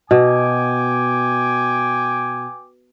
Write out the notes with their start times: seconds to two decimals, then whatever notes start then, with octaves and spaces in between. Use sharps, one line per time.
0.11 B2 G5 G#5 D6